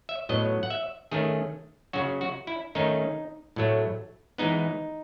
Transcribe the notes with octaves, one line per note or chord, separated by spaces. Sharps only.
E5
A2 F#3 B3 D#5
F#5
E5
D#3 A3 C#4 G#4
C#3 F#3 C#4 F#4
F#4
E4
D#3 A3 C#4 D#4
A2 F#3 A3
E3 G#3 B3 D#4